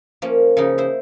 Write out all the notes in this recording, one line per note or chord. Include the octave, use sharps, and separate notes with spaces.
F3 A#3 C#4
C#3 F3 C#4 D#4
E4 C5